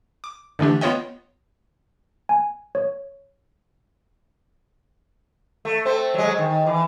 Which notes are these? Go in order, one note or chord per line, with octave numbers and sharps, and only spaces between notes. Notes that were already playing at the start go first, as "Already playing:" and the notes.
D6
D3 E3 A3 D4 G4
B3 F4 C#5 D#5 G5
G#5
C#5
A3
A3 C4 C5
F#3 G#3
D#3
E3